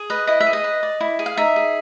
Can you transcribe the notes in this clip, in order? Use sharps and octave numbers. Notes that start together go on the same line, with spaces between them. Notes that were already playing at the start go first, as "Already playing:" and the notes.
Already playing: G#4
B4 D#5
E4 D#5
E5
G#4
D#5
B4
D5
E4
G#4
F5
D#4 E5
G#4